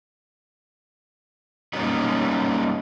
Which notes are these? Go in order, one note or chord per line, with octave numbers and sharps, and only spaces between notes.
G3 A#3 B3 C#4 D#4